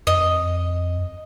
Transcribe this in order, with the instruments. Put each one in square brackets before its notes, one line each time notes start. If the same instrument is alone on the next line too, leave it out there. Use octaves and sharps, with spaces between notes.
[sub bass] F2 [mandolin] D#5